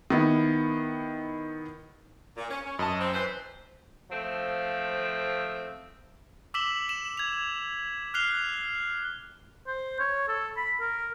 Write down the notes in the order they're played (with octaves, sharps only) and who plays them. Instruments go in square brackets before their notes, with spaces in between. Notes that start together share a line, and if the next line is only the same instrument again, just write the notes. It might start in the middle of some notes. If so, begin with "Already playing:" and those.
[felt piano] D#3 B3 E4
[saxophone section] A#2
C#4
C#4
[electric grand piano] F#2 A5 [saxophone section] B4 C#5 D#5
[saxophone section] C4
E3 B4 C5
[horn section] F3 A3 C4
[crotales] D6 E6 B6 E7 F#7 G7
E7
G#6 F7
F6 F#6 C7 F7 G7
[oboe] C5
C#5
A4
B5
A#4